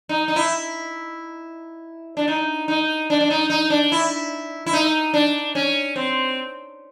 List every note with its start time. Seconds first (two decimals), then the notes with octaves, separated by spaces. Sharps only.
0.09 D#4
0.28 D#4
0.36 E4
2.17 D4
2.28 D#4
2.68 D#4
3.10 D4
3.21 D4
3.30 D#4
3.50 D#4
3.70 D4
3.92 E4
4.66 E4
4.73 D#4
5.14 D4
5.55 C#4
5.96 C4